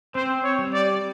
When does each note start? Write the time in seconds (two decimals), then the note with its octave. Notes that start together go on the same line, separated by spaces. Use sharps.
0.15 C4 C5
0.44 C#5
0.59 G3
0.73 D5